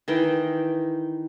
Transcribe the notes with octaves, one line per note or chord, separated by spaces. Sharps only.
D#3 E3 G5